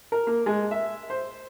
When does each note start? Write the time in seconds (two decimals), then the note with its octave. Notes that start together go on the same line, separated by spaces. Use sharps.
0.12 A#4
0.27 A#3
0.46 G#3
0.71 E5
1.10 C5